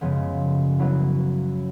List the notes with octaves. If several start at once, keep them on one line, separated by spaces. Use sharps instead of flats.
F#2 C#3 F3 G#3 B3
F#3 B3 E4